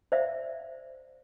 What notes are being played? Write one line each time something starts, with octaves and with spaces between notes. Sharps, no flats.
C5 D5 E5 F5